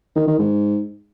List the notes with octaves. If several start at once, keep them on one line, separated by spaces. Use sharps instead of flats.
D#3
D#3
G#2